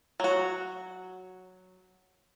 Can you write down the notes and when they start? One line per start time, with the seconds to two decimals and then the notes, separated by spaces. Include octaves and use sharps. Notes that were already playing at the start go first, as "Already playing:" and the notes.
0.20 F#3 F#4